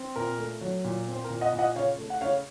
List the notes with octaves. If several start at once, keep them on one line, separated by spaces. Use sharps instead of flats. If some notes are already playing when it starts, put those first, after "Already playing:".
Already playing: C4
A#2 A#4
A3
F#3
A#2
C4 C5
A#4
A#2
D#5 F#5
A#2
D#5 F#5
C#3 C#5 F5
A3
F#5
C#3 C#5 F5